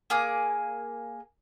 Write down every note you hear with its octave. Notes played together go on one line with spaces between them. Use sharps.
A#3 G#4 D6